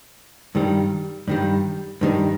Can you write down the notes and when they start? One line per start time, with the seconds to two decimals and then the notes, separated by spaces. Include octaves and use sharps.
0.55 G2 D#3 G3
1.28 G2 D#3 G3
2.01 G2 D#3 G3